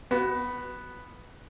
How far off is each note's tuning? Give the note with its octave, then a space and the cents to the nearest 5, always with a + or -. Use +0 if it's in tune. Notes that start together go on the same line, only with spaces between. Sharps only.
B3 +0 F#4 +30